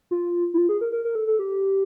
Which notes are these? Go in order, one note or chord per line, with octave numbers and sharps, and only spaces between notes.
F4
E4
F4
G#4
A#4
A#4
A#4
A4
A4
G4